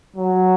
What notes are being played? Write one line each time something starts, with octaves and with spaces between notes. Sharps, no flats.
F#3